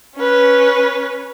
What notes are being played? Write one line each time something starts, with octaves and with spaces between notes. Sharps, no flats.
C#4 B4